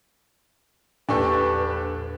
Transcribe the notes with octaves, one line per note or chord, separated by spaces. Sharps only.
A#1 E2 D4 G4 A4 B4 C#6